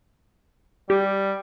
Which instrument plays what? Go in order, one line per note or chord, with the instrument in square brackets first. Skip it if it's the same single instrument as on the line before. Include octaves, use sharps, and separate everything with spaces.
[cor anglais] G3 [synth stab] G4